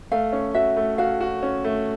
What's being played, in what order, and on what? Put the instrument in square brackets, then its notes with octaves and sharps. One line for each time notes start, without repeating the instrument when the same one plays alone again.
[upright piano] A3 [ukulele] F5
[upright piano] C#4
[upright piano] F#4 [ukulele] E5
[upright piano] A3
[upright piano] F#4 [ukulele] F5
[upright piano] F#4
C#4
A3